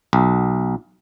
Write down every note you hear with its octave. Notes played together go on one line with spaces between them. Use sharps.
B1